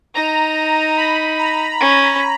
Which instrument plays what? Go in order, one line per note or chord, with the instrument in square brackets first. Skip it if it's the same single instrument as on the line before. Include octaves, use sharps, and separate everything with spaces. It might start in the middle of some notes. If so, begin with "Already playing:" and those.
[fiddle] D#4 [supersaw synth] A#5
[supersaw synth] B5
A#5
[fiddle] C#4